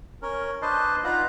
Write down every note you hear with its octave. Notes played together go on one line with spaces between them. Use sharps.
C#4 A#4
D4 B4 C5 D#5 A5 C6
D#4 F4 B4 F5 F#5 A#5